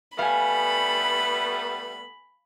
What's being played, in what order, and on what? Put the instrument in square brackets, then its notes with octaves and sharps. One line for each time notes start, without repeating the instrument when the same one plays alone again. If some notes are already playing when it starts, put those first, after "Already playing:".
[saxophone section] G3 A3 B3 [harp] F5 G#5 [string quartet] B5